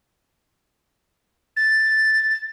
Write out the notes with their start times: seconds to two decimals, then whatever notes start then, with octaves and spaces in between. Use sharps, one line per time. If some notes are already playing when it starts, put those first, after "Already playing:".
1.57 A6